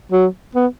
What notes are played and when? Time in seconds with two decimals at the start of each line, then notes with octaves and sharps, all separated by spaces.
0.11 F#3
0.55 B3